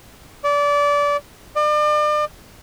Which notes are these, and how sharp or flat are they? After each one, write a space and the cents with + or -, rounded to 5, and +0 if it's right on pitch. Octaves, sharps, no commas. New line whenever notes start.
D5 -25
D5 +40